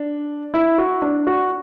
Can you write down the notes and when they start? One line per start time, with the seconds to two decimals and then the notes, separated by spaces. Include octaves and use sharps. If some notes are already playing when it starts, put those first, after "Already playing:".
Already playing: D4
0.54 E4
0.78 F#4
1.02 D4
1.27 F#4